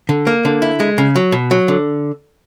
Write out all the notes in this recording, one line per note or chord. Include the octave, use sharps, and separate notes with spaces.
D3
A#3
D3
E4
G#3
C#3
F#3
B2
F#3
D3